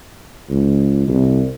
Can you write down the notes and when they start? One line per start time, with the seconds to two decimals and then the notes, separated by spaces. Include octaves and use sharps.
0.50 C#2
1.08 C2